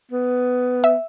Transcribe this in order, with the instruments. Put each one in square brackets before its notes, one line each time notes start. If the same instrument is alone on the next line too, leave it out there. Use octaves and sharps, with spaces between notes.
[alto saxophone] B3
[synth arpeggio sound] E5